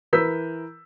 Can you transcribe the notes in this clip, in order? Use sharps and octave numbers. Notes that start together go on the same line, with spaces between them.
E3 A#4 B4 E6 G6 B6